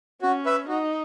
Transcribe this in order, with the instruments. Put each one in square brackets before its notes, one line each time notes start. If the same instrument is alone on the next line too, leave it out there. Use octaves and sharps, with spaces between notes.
[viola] C#4 [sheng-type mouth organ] F#4
[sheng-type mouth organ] B4 E5
[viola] D#4 [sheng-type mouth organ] F#4